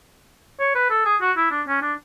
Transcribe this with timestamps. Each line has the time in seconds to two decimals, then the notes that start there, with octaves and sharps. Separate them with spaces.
0.60 C#5
0.75 B4
0.90 A4
1.05 G#4
1.21 F#4
1.37 E4
1.51 D4
1.67 C#4
1.82 D4